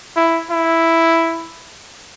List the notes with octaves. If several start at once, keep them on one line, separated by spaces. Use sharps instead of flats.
E4
E4